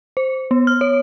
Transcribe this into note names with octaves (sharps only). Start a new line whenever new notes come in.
C5
B3
F6
C#5